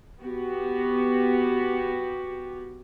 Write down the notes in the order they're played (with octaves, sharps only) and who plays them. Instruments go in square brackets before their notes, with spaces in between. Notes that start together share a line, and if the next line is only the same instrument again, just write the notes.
[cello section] B3 F#4 G4